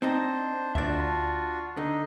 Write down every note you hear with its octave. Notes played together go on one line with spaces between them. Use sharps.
C4 D4 D#4 C5 D#5
D2 D4 F4 F#4 D5 E5
A5
D3 D#4 D#5